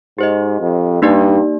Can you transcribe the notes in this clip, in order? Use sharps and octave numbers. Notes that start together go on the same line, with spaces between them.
G#2 G4 C5 D#5
F2
G2 A#3 D#4 G4 D5